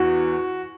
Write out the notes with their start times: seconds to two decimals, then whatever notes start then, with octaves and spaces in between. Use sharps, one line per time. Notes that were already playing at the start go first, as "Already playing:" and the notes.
Already playing: E2 F#4